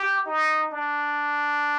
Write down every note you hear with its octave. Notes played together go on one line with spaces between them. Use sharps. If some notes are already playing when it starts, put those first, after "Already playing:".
Already playing: G4
D#4
D4